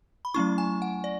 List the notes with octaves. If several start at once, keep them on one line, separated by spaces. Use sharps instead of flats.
B5
F#3 A3 C#4 E4 C#6
G#5
F#5
D5